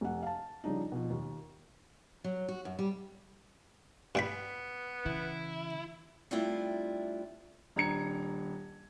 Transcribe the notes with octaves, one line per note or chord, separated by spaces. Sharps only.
F1 F#5
F5 A5
C#3 F3 G3 D4 D#4
B2 F3
D#2
F#3
F#4
F#2
G3
G2 B3 G5 B5
C#3 E3 E4
G3 A3 C4 D4 E4 F4
D#1 D4 A#5 G#6 C#7